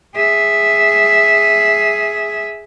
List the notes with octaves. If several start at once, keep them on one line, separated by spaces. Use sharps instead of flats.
G#4 E5